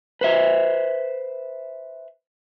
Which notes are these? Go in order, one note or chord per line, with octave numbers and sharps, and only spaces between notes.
B4 C5 E5